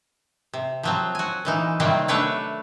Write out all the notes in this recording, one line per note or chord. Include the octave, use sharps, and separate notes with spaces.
C3
F3 F#3 C4
F#4 G#5
A#2 E3 D#4
C3 D#3 F#3 G3 A#3 C4
A3 D4 B4 C#5 D5